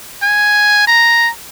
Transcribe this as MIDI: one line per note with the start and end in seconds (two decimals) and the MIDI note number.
0.23 0.85 80
0.87 1.30 82